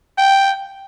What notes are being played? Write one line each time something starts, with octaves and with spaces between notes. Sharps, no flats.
G5